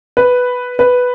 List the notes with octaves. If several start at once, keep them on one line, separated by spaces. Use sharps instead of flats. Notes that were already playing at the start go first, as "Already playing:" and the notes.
B4
B4